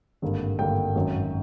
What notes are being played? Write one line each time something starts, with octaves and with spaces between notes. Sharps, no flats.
G#1 G2 D3 G3 A#3
G#1 G2 D3 G3 A#3 G5
G#1 F#2 D#3 F#3